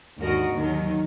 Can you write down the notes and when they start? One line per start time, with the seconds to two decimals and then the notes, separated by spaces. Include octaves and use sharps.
0.19 D#2 G#2 D3 F#4 A#4 D#5
0.51 D#2 D#3 F#3